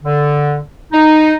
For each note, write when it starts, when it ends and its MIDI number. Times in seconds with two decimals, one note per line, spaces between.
0.04 0.58 50
0.92 1.35 63